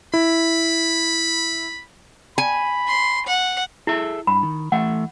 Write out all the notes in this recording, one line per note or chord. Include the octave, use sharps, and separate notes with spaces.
E4 B5
G#5 B5
C6
F#5
E4 G#4 A4 E5
G2 B5
D#3
E3 A3 E5 F#5